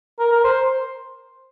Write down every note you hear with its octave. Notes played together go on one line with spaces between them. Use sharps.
A#4
A#4
C5